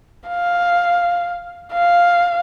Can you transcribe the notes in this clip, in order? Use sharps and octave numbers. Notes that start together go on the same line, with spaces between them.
F5
F5